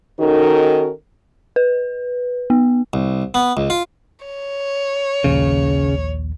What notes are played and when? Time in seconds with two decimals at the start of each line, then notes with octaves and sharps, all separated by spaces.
0.19 D#3 C#4 D#4 F#4 A4 A#4
1.56 B4
2.50 B3
2.93 C2
3.34 B3
3.57 C#2
3.70 F4
4.26 C#5
5.24 A#1 D#2 C#3